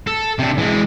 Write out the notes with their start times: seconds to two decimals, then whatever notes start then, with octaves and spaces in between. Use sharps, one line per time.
0.07 A4
0.39 C3 D4
0.58 E3 G#3